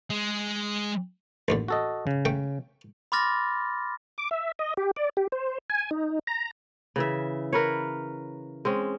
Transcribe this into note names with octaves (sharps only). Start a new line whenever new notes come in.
G#3
A1 D#2 D3
F#4 A4 D#5
C#3
A3 G5
B5 C6 D6 F6 A6 A#6
D6
E5
D#5
G4
D5
G4
C5
G#5
D#4
A#5
C#3 E3 E5
A#4 B4 C#5
G#3 C4 C#4